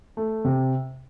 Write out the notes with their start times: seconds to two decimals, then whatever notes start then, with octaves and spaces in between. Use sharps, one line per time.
0.17 A3
0.45 C3